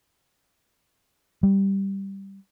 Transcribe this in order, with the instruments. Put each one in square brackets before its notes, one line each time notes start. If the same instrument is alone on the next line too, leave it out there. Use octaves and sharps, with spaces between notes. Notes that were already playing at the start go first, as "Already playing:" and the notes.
[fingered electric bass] G3